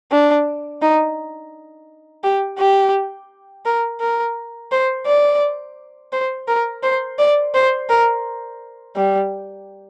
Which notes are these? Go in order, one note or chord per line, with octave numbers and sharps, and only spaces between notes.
D4
D#4
G4
G4
A#4
A#4
C5
D5
C5
A#4
C5
D5
C5
A#4
G3